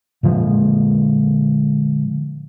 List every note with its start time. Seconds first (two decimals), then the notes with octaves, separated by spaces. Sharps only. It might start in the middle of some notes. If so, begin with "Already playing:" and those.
0.23 A#2 D3 F3 G#3